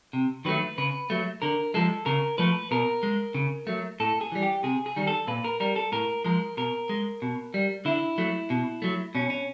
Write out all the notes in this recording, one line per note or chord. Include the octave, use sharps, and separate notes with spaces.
C3
D#3 F#3 A3 B4
C#3 B4
F#3 A3
D3 A#4
F3 G#3 A4
C#3 A#4
F3 A3 B4
B2 A#4
G#3
C#3
F#3 A3
A2 A4
G#4
E3 G3
G4
C3 G#4
G#4
D#3 G3
A4
A#2 B4
A#4
G3 A#4
A4
A2 A#4
F3 G#3 A#4
B2 A#4
G#3
B2
G3
D3 E4
F#3 A3
B2
F#3 A3
B2 C#4
C#4